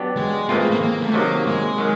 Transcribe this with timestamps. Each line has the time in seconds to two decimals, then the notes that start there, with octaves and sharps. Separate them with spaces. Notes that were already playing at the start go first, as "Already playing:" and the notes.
Already playing: F#3 B3 D4 G4
0.17 G#3
0.49 A2 E3 G#3 A#3 C4 F4
0.60 A#3
0.71 A#3
0.81 A#3
1.02 A3
1.14 C3 D#3 F#3 A#3
1.46 G#3
1.78 D#3 F#3